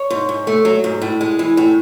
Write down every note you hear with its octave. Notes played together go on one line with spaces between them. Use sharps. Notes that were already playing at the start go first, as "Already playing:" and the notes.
Already playing: C#5
G#2
G#2
A3
F#3
G#2
A2
G#3
E3
A2